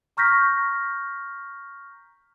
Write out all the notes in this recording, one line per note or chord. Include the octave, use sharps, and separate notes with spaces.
A#5 C#6 F6 G6 A#6 B6